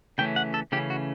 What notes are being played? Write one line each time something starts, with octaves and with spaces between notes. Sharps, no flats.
C#3 E3 A3 C#4 G5
F#5
A4
C#3 E3 A3 C#4 G4
F#4